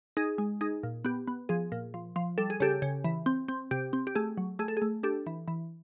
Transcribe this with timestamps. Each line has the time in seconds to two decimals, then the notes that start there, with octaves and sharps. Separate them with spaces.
0.17 D#4 G#4
0.38 G#3
0.61 D#4 G#4
0.83 A#2
1.05 B3 G4
1.28 B3
1.49 F3 G#4
1.72 A#2
1.94 F3
2.16 F3
2.38 G3 A4
2.50 G#4
2.60 C#3 G4 A4
2.82 C#3
3.04 E3
3.26 C4
3.48 C4
3.71 C3 G4
3.93 C4
4.07 G4
4.15 A3 G#4
4.37 F#3
4.59 A3 G#4
4.68 A4
4.77 A3 G#4
5.03 D4 G4 A4
5.27 E3
5.48 E3